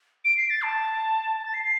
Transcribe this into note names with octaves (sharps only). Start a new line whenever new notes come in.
D7
C7
A6
A5
A5
A6
C7
C7